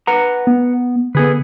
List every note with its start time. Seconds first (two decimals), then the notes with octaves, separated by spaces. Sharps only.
0.07 B4 F#5 A#5
0.47 B3
1.15 D3 B3 G#4 B4